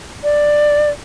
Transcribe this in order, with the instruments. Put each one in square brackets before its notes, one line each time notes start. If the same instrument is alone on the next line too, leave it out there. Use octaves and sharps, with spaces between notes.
[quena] D5